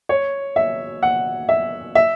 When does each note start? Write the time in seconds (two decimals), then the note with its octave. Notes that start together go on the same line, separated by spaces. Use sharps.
0.09 C#5
0.56 E5
1.03 F#5
1.49 E5
1.95 E5